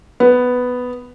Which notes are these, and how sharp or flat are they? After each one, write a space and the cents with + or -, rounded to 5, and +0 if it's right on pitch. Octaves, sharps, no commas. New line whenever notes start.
B3 +5